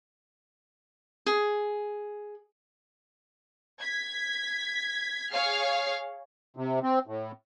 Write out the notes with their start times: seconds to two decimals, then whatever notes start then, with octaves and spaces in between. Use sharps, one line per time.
1.26 G#4
3.80 G#6 B6
5.32 G#4 C#5 F5 F6 C7
6.57 C3
6.83 C4
7.07 A2